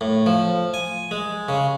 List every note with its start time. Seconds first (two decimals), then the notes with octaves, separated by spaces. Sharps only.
0.01 A2
0.26 F3
0.74 G#5
1.11 G#3
1.49 C#3